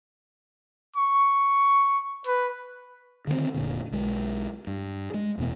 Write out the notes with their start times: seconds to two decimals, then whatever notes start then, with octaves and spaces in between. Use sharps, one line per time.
0.97 C#6
2.27 B4
3.27 D3 D#3 G3 C4
3.54 F1 A#2 D3
3.92 B1 G#3
4.67 G2
5.14 G#3
5.37 D1 E2 B2 B3